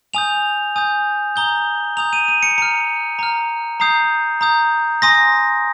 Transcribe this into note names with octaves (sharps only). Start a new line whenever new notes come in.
G#5 D#6 G6 F7
G#5 D#6 G6
A#5 D#6 G6 G7
A#5 D#6 G6 F7
D#7
D#7
C#7
A#5 F6 C#7
A#5 F6
A#5 D#6 G6 C7
A#5 D#6 G6
G#5 C6 D#6 A#6